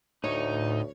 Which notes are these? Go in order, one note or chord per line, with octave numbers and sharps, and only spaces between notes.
D2 A2 D#4 C#5